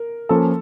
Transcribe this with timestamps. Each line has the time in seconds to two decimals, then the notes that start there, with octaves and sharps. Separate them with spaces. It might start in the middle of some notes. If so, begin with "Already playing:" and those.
Already playing: A#4
0.29 F3 A#3 C#4 F4 A4